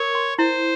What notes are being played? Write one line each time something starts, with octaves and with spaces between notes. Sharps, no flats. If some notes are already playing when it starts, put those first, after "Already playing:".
Already playing: A#4 C#5
C6
E4 C5